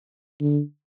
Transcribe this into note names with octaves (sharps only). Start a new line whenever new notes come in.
D3